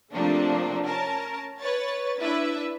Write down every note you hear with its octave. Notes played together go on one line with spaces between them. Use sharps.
C3 F3 A3 A#3 C4 D4
C#4 A#4 A5
B4 C#5 A6
D4 E4 B4 E5